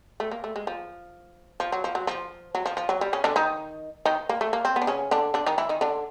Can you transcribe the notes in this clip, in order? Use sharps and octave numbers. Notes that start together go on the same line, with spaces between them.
A3
A#3
A3
G#3
F3
F3
F#3
F3
F#3
F3
F#3
F3
F3
F#3
G3
C#3 C#4
D3 D4
D#3 D#4
D#3 D#4
A#3
A3
A#3
C4
B3
D4
C#3 C#4
D3 D4
D3 D4
D#3 D#4
E3 E4
D#3 D#4
D3 D4